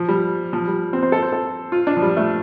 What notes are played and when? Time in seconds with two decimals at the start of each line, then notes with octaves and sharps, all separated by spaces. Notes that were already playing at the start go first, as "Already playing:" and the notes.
Already playing: F3
0.09 G3
0.53 F3
0.68 G3
0.93 C4
1.03 C5
1.12 A4
1.22 C5
1.33 A4
1.72 F4
1.87 D4
1.97 F3
2.02 G3
2.17 A3